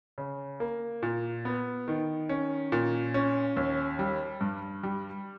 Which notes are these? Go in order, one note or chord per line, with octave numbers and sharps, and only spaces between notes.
C#3
A#3
A#2
B3
D#3
C#4
A#2
C#4
D#2
G3
G2
G3